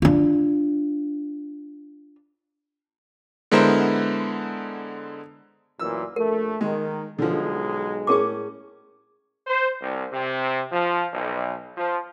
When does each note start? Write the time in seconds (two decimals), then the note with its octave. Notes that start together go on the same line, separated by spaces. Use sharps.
0.02 D4 F4
3.51 D3 G#3 B3 E4 A#4 C5
5.79 F#2 A#2 E3 E6
6.16 A#1 A3 A#4
6.61 D#3 G#3
7.18 B1 D3 F3 G#3
8.07 A2 C#4 G#4 A#4 C#6 D6
9.46 C5
9.82 C2
10.13 C3
10.72 F3
11.13 B1
11.77 F3